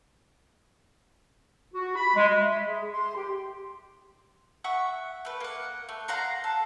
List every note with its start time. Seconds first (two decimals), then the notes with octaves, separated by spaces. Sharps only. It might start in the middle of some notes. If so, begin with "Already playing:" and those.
1.74 F#4
1.96 B5
2.15 G#3
2.40 E5
2.66 G#4
2.91 C6
3.15 G4
4.64 E5 F#5 C#6
5.25 A3 B4
5.40 A#3 F#5
5.89 A3
6.08 F5 F#5 A#5 C6
6.44 A4